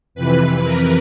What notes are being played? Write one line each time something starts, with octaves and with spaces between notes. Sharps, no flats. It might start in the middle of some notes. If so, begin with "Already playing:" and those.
F2 C3 E3 B4
A#4